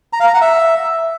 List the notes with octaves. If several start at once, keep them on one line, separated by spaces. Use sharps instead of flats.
A#5
F5
A#5
F#5
E5